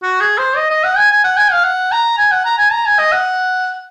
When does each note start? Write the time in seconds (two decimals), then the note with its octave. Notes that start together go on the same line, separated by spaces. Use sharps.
0.03 F#4
0.21 G#4
0.38 C5
0.57 D#5
0.70 D#5
0.84 F#5
0.97 G#5
1.11 G#5
1.24 F#5
1.37 G#5
1.51 F5
1.64 F#5
1.92 A#5
2.18 G#5
2.31 F#5
2.46 A#5
2.58 G#5
2.72 A#5
2.86 G#5
2.99 D#5
3.12 F#5